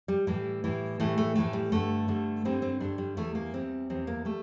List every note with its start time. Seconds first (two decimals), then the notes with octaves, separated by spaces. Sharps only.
0.08 G3
0.27 A2 E3 G3
0.64 A2 E3 G3
1.00 A2 E3 G3 A3
1.18 A3
1.36 A2 E3 G3 A3
1.53 G3
1.72 G2 D3 G3 A3
2.08 G2 D3 G3
2.45 G2 D3 G3 C4
2.62 C4
2.81 G2 D3 G3 D4
2.98 G3
3.17 E2 E3 G3 A3
3.35 A#3
3.54 E2 E3 G3 C4
3.90 E2 E3 G3 C4
4.07 A#3
4.25 G3 A3